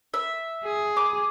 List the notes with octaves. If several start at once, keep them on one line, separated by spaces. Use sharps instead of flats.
E5
G#4
D6